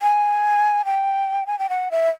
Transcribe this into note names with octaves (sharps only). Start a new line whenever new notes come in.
G#5
G5
G#5
G5
F#5
E5